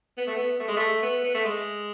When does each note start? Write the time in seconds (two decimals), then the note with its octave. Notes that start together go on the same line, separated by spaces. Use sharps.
0.17 B3
0.27 A3
0.36 B3
0.60 A3
0.68 G#3
0.77 A3
1.02 B3
1.24 B3
1.34 A3
1.44 G#3